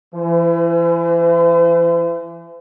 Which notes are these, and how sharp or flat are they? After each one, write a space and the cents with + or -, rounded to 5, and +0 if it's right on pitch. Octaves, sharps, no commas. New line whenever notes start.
E3 +30 C5 -45